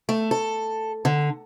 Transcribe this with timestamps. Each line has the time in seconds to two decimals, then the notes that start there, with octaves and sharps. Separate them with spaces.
0.09 A3
0.31 A4
1.05 D3